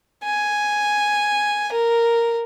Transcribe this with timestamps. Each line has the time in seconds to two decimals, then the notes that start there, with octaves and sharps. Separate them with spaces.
0.24 G#5
1.72 A#4